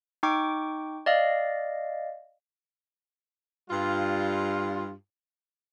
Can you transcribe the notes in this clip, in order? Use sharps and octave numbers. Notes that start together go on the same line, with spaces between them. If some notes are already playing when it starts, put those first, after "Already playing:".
D#4 G5 C#6 D6
D5 D#5 F5
G2 G3 F4